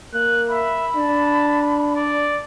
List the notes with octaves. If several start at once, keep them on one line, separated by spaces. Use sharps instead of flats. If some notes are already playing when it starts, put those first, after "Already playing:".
A#3 F#6
E5 B5
D4 A5
D5